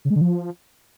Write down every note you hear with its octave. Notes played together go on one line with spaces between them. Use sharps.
C#3
G#3
D3
F3